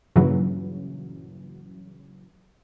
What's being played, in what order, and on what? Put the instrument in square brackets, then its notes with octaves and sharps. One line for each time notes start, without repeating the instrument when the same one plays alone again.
[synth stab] G2 A#2 C#3 E3 F#3